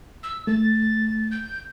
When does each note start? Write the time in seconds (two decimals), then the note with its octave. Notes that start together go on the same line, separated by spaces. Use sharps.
0.23 E6
0.47 A3 A6
1.31 G6